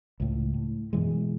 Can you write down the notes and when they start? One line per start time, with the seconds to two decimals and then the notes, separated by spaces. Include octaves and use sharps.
0.20 C#2 A2
0.54 A2
0.93 F#2 B2 E3 G#3